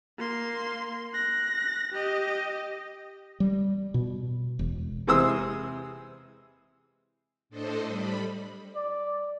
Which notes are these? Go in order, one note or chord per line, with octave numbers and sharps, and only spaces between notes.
A#3 C6
F#6 A#6
G4 D#5
G3
B2
E1
C3 E3 G#3 C5 D#6 E6
A2 D4 A4 C5 D#5
G3 B5
D5